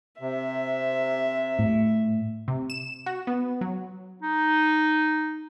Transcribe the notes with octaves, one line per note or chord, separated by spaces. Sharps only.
C3 E5
A2
C3
E7
F#4
B3
F#3
D#4